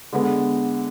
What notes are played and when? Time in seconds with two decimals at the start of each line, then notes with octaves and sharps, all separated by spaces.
0.13 D3 G#3 B3